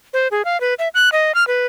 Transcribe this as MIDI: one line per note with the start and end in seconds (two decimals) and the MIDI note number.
0.13 0.28 72
0.31 0.42 68
0.45 0.60 77
0.61 0.74 71
0.79 0.88 76
0.95 1.09 90
1.12 1.32 75
1.35 1.46 89
1.47 1.67 71